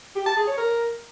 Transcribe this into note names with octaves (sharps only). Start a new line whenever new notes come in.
G4
A5
G#4
C#5
A#4